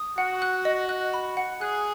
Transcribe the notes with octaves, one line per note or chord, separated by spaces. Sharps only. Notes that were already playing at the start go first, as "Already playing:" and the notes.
Already playing: D#6
F#4 F#5
F#6
D#5
F#6
B5
F#5
G#4 F#6